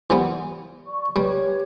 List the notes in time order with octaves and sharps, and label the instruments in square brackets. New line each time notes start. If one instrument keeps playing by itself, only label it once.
[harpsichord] E3 G3 B3
[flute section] D5 C#6
[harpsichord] G3 [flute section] G4 B4 C#5